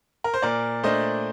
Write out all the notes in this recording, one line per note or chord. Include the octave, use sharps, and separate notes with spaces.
A#4
C5
A#2 A#4 D5
A3 D4 C5 D#5